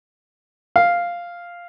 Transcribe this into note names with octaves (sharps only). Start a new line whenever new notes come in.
F5